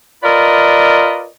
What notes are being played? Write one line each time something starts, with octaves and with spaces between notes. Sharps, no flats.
F4 A#4 B4 D5 D#5